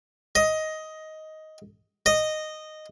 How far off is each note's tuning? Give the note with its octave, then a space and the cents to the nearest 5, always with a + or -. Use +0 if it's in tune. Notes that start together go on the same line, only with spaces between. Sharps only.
D#5 +10
D#5 -10